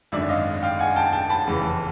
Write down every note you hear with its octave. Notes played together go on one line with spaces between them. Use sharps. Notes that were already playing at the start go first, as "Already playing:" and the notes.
G#1 F#2 D3 D5 E5
D#5 F5
F5 G5
F#5 G#5
G5 A5
G5 A5
A5 B5
F1 E2 C#3 E3